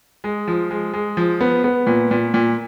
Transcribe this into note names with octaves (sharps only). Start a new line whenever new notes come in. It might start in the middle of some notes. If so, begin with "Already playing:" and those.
G#3
F3
G#3
G#3
F3
B3
B3
A#2
A#2
A#2